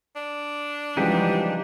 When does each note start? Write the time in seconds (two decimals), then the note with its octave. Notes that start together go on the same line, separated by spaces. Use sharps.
0.16 D4
0.97 C#3 E3 F3 G3 G#3 D#4 G4 F#5